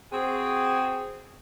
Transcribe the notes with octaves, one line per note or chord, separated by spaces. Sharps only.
C4 F#4 G#4